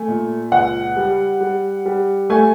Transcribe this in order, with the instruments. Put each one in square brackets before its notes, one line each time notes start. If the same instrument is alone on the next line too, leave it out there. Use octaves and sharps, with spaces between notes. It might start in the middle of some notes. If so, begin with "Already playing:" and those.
Already playing: [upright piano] A3 G#5
A#2
C#2 F#5
G3
G3
G3
A3 G#5